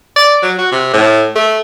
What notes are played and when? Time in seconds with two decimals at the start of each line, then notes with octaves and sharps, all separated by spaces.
0.16 D5
0.43 F#3
0.59 F#4
0.72 C3
0.93 A2
1.36 A3